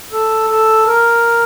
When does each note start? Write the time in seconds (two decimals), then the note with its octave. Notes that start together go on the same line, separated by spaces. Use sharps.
0.13 A4
0.50 A4
0.87 A#4